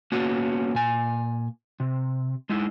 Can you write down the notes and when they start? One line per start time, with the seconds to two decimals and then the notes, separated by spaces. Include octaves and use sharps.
0.12 A#3 B3 C#4 F#4
0.74 A#2 G#5
1.80 C3
2.49 G#3 D#4 E4